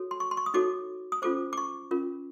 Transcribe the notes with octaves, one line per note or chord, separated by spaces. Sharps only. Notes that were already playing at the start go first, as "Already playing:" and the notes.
Already playing: F#4 A4 C#5
C6
C#6
C6
C#6
D#6
D#4 F#4 A4 C#5 D6
D#6
C#4 F4 A4 C5 D6
D6
C#6
C#4 F4 A#4